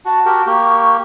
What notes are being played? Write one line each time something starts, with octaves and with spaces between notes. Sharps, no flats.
F#4 A5
F#4 G4 A#4
A#3 G4 C#6